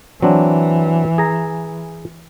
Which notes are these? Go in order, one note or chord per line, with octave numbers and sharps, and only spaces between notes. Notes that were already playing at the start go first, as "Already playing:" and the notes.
E3 F#3 C4 D4
G#4 A#5